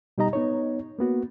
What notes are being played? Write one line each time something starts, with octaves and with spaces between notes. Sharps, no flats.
B2 G3 D#4 G4 D#5 A#5
B3 D#4 C#5
A#3 B3 F#4